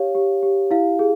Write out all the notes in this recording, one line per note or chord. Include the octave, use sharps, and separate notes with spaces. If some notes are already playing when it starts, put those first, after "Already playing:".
Already playing: G4 C#5 F5
G4
G4
E4 F5
G#4